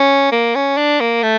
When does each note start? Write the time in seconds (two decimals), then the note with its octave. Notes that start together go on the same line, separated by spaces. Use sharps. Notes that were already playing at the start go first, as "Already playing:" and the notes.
Already playing: C#4
0.32 A#3
0.55 C#4
0.77 D4
1.00 A#3
1.23 A3